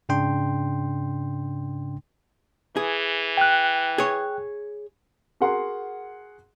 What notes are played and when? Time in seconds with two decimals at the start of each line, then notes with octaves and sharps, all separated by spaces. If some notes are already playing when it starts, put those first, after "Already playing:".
0.09 G#2 C#3 D4 G5 C6
2.77 E3 G#4
3.37 G5 F#6
3.98 G#4 C#5
5.41 F#4 G#4 A#4 F#5 C6